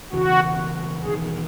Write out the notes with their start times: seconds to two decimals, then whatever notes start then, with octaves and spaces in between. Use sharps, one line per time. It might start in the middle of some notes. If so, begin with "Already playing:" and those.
0.13 E1 E2 C#3 E3 F#4
1.05 E1 E2 D#3 G#4